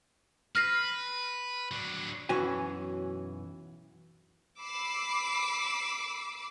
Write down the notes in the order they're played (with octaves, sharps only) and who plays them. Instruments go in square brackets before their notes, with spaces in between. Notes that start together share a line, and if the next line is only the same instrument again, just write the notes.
[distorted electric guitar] B4 [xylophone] F6 A#6 C7
[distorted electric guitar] F#3 D4
[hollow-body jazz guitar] B1 F#2 E3 C#4 F#4 G#5
[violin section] B5 D6 E6 C7